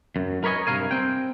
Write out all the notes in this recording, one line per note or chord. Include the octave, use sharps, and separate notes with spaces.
F#2
A#4 B4 C#5 D#5 G#5
G2 C3 F3 A#4 F5 G#5
C4 G5